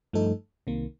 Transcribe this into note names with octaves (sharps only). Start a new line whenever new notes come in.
G2 F3 A3 D#4 A4
C2 C3 D#3 A#3